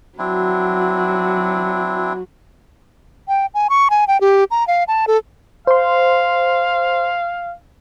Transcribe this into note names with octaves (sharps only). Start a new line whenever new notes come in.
F#3 C4 D4 E4 F#4
G5
G#5
C#6
G#5
G5
G4
A#5
F5
A5
A4
C5 F5 C6